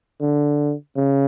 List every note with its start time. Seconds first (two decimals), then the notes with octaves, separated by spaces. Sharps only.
0.21 D3
0.96 C#3